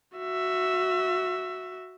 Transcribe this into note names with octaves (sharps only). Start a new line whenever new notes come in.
F#4 E5